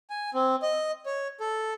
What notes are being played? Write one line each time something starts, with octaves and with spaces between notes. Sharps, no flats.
G#5
C4
D#5
C#5
A4